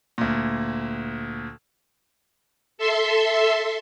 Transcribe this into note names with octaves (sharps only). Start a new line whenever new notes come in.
D2 A#2
A4 E5 C6